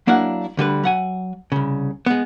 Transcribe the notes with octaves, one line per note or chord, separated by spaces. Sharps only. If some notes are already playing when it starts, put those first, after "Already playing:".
F#3 A#3 D4 E4 F#5
D2 D3 G3 B4
F#3 F#5 G#5
C2 C#3
G#3 B3